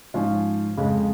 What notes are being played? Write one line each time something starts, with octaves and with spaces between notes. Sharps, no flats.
G#2 F3 C#4 F4
F2 C#3 G#3